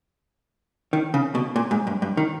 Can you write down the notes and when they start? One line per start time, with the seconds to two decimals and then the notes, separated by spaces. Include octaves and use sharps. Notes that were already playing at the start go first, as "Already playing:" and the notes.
0.93 D#3
1.14 C#3
1.35 B2
1.56 A#2
1.71 G#2
1.87 G2
2.02 G2
2.17 D#3